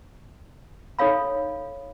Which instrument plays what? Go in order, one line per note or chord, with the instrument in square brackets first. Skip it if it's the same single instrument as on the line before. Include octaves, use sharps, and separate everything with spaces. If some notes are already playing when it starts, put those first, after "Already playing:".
[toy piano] D#4 A4 C#5 F5 B5